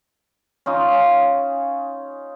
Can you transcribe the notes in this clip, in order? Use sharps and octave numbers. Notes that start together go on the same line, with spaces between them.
C#4 D#4 F4